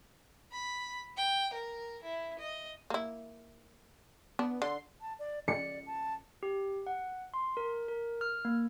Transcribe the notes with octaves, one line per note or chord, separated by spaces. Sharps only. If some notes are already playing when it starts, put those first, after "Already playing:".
B5
G5
A#4
E4
D#5
A#3 E4
B3 D4
D3 C6
A5
D5
D5 C#7
A5
G4
F#5
C6
A#4
A#4
F6
A#3